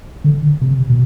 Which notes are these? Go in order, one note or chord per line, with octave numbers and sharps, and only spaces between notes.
D3
C3
B2